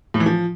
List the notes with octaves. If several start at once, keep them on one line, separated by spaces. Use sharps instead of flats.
A2
E3
F3